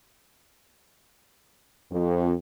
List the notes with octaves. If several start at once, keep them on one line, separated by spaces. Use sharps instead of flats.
F2